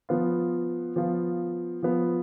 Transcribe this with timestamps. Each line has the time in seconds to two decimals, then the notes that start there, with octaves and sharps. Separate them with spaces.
0.09 F3 B3 F4
0.96 F3 B3 F4
1.83 F3 B3 F4